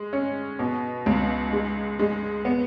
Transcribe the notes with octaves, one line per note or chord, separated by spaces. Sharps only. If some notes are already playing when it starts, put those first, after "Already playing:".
Already playing: G#3
C#4
B2
C#2
G#3
G#3
B3